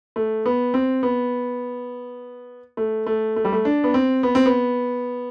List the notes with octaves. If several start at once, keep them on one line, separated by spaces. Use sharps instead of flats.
A3
B3
C4
B3
A3
A3
A3
G3
A3
D4
B3
C4
B3
C4
B3